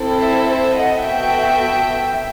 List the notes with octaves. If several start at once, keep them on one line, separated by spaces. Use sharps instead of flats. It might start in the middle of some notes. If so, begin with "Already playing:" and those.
Already playing: C4 E4 A4
C5 E5
C5 E5
D#5 F#5
B3 F#4 A4 E5 G5